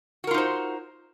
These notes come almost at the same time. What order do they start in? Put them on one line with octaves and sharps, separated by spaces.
F#4 A#4 F4 D#4 C5